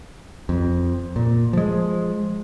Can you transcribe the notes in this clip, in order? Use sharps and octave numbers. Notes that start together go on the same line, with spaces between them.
F2
A#2
F3 G#3